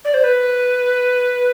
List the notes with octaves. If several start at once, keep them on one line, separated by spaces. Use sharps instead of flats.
D5
C5
B4